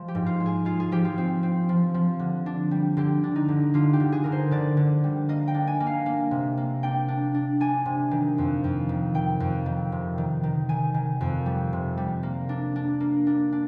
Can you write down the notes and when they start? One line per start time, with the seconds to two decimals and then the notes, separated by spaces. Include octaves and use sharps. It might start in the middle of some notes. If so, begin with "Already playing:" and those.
Already playing: F3 G#3
0.08 G4
0.15 G#2
0.26 F4
0.40 G#3
0.46 G#4
0.65 G#3 F4
0.80 G#4
0.92 F3 G4
1.05 F4
1.18 C4
1.43 C4
1.69 F3
1.94 F3
2.19 D3
2.46 D4
2.71 G3
2.97 D3 G4
3.24 D4
3.36 D#4
3.48 D3
3.74 D3 F4
3.93 G4
4.00 D3
4.12 G#4
4.24 D3 A#4
4.32 C5
4.51 D3 D5
4.77 D3
5.04 G3
5.29 A#3 D#5
5.48 G5
5.54 D4
5.67 G#5
5.80 A#3
5.87 F5
6.06 A#3
6.31 C3
6.57 A#3
6.83 D4 G5
7.08 D4
7.34 D4
7.60 D4 G#5
7.86 C3
8.11 D#3
8.38 F2
8.64 F2
8.89 D#3
9.14 D#3 G5
9.40 F2
9.66 D#3
9.92 C3
10.18 D#3
10.43 D#3
10.69 D#3 G#5
10.94 D#3
11.21 F2
11.46 G3
11.73 C3
11.97 G3
12.23 A#3
12.49 D4
12.76 D4
13.00 A#3
13.27 D4
13.52 D4